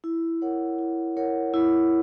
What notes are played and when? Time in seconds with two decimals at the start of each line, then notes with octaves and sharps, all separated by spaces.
0.04 E4
0.42 A#4 C#5 F#5
0.79 E4
1.17 A#4 C#5 F#5
1.54 E4